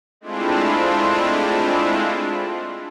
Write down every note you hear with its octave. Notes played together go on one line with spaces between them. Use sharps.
G#3 A3 C4 D4 E4 F4